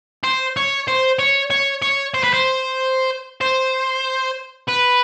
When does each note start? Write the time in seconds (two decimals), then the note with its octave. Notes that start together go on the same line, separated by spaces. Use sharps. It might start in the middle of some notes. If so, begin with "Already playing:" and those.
0.24 C5
0.57 C#5
0.88 C5
1.19 C#5
1.50 C#5
1.82 C#5
2.14 C5
2.24 B4
2.33 C5
3.41 C5
4.68 B4